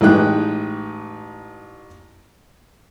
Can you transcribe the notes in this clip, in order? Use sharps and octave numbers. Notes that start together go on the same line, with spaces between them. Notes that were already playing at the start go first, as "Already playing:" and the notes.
A1 E3 G#3 D#4 G5 F#6